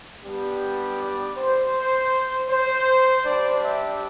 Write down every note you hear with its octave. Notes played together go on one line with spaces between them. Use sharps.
G3 B3 D4 G4
D5
C5
C5
G3 D4 G4 D5
E5